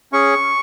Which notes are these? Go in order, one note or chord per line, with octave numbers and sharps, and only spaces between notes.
C#4 G#4 C#6